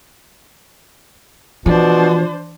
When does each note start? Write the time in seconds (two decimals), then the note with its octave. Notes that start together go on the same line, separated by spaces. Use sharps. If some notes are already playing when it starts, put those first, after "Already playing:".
1.66 B2 E3 F3 D4 C5